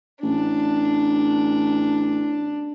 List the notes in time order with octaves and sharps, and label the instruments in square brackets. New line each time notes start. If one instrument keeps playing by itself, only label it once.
[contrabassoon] A1 [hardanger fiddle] D4